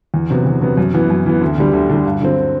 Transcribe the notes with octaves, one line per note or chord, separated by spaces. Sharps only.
E2
C3 F#3 B3
E2
C3 F#3 B3
F#2
E3 B3
F#2
E3 B3
D2
D3 G3
D2
D3 G3
G2
D3 F#3 C4